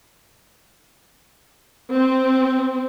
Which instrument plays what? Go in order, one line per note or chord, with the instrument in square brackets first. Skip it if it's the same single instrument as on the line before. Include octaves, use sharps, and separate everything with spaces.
[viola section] C4